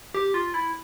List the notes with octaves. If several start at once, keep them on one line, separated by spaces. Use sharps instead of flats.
G4
F4
E4